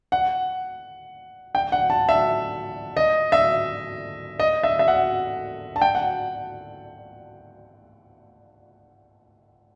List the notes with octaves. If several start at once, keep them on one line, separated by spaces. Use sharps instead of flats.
F#5
G5
F#5
A5
E5
D#5
E5
D#5
E5
E5
F#5
A5
G5
F#5